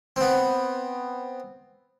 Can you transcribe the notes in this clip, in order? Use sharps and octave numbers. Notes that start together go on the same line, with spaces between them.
B3 C4